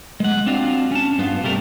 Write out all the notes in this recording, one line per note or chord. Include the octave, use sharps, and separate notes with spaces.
G#3 F#5
C4 D4 F4 F#4
C#4 A5
G2 B3 F4
C3 G3 A3 A#4